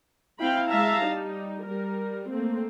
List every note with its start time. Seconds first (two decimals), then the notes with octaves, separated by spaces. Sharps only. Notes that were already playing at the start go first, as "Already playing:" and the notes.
0.40 C4 E4 F5 G5 B5
0.70 G#3 E5 F5 A5 A#5
1.01 G3 D#4
1.64 G3 A#4
2.30 A3 A#3 C4